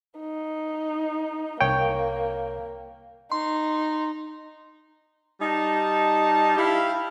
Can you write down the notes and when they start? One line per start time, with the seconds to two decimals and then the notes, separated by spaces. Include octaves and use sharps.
0.19 D#4
1.61 C2 A#3 C#5 G5
3.32 D#4 C6
5.40 G3 D#4 A5
6.57 E4 G4 F5